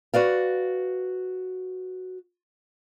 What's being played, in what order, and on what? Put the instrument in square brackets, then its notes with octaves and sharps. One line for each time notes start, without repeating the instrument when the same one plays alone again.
[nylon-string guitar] F#4 B4 D5 F5